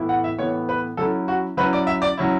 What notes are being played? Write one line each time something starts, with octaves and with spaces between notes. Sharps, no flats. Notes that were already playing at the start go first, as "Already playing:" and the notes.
Already playing: A2 E3 B3 E4
F#5
E5
A2 E3 B3 E4 C#5
B4
F#3 C#4 E4 A4
F#4
F#3 C#4 E4 B4
D5
E5
D5
F#3 C#4 E4